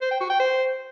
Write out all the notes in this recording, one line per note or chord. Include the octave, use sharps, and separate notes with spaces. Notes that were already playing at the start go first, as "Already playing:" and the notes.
C5
G5
F#4
G5
C5